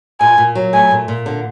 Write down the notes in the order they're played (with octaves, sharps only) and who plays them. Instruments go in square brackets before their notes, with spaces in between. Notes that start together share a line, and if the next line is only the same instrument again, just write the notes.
[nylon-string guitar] A#2 [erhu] G#5
[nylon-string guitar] A#2
F#3
[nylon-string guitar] A3 [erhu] G#5
[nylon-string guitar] A#2
A#2
D3